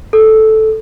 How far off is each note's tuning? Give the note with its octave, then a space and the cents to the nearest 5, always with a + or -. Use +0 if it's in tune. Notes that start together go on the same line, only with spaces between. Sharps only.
A4 -5